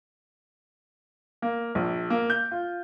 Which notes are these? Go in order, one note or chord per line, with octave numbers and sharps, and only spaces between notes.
A#3
A#1
A#3
G6
F4